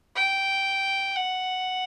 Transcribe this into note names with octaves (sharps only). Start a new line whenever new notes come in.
G5
F#5